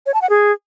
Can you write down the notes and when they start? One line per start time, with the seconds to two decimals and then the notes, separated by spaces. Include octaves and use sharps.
0.06 C#5
0.14 A5
0.22 F#5
0.29 G#4